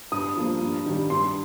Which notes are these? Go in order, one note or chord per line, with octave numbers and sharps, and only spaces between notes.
G2 D#6
F3 A#3
G2
D#3 G3
G2 C6